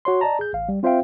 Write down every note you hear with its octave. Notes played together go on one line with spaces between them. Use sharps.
F#4 C#5 C6
D5 D#5 A5 A#5
G#4 G6
A1 F5
G3
C4 F4 C5 E5 F5 G5